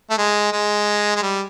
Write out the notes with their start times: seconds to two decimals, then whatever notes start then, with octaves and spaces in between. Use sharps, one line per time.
0.10 A3
0.18 G#3
0.52 G#3
1.16 G#3
1.22 G3